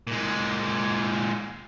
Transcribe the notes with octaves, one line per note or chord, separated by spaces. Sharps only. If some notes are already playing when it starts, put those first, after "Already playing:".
A#2 G#3